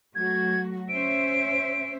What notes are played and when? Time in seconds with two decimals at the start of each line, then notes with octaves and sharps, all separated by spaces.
0.15 F#3 A3 F#4 G#6
0.88 C#4 C5 E5 D7